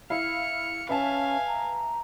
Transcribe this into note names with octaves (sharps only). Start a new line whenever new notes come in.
E4 F5 F6 C#7
C#4 B4 E5 F5 G#5 A5
A#5